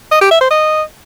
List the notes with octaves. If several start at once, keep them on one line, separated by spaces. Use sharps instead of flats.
D#5
G4
E5
C5
D#5